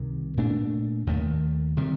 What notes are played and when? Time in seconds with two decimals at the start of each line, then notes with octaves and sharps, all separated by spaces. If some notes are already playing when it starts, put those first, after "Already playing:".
Already playing: C2 C3 D#3
0.37 A#2 A3 D4
1.07 D#2 D#3 A3
1.77 C3 D#3 G3